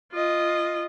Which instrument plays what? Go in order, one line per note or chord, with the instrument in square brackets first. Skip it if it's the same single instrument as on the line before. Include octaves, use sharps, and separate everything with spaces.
[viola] F4 D#5